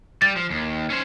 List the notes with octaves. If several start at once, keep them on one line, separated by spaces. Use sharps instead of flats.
G3 A6
F3
D#2
C#4 C5